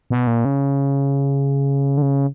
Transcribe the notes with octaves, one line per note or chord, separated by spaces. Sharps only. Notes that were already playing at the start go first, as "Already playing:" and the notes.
B2
A#2
C#3
D3
C#3